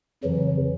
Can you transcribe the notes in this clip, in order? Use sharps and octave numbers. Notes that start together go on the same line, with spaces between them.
F2 C#3 E3 F#3